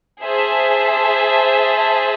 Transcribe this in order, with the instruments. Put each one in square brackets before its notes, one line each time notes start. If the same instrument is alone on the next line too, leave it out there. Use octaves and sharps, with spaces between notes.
[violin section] G#4 C5 E5 A5